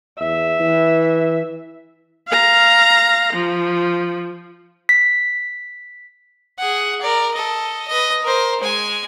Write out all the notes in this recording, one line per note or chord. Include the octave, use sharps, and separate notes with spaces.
E2 E5
E3
F5 A#5
F3
B6
G#4 F#5
A#4 D5
A4 D#5
B4 D#5
A#4 C5
G#3 G#5